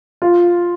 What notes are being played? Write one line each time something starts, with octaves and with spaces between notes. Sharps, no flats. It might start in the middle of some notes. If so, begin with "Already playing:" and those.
F4